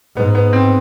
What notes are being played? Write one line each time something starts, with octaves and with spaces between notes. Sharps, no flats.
G#2 B3
B3
C4